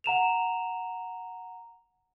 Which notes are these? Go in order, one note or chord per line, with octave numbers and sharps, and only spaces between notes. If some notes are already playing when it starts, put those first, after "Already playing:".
F#5 A#5 E7 F7